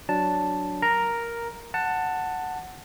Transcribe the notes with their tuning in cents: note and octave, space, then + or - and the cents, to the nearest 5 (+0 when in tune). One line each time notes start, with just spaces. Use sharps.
F#3 +0 D4 +0 A5 +0
A#4 +0 A#5 +0
F#5 +0 A5 +15